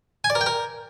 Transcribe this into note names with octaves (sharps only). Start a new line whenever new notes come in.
G#5
D5
A#4
G5
A#4